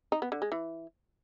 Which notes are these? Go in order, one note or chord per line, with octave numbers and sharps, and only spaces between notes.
D#4
B3
D3
G#3
E3